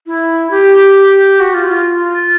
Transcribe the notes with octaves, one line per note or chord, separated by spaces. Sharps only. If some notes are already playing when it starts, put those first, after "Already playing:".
E4
G4
F#4
F4
F4